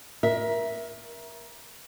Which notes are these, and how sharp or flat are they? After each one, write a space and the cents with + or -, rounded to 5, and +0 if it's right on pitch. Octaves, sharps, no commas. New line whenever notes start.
A#4 +25 E5 +0